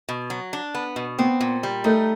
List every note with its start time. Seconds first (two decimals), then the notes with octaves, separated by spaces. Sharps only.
0.09 B2
0.30 F#3
0.53 D4
0.75 B3
0.96 B2
1.19 B3 C4
1.41 A#2
1.63 G3
1.84 A3 D#4